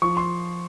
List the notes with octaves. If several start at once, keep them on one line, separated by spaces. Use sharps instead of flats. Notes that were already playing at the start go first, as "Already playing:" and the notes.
F3 C#6
C6